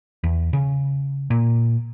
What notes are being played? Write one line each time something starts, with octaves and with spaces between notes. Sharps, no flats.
E2
C#3
A#2